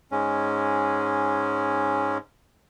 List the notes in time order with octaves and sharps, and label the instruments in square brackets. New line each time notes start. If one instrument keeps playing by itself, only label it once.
[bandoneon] G#2 G#3 C#4